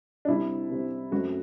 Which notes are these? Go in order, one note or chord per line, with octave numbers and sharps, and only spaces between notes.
D4
C2 C3 G3 C4 E4
C2 C3 G3 C4
F#2 F#3 A3 C4 F#4